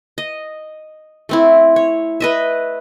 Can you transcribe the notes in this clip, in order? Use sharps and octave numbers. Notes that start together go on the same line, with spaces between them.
D#5
A3 C4 E4
C#5
B4 D#5 E5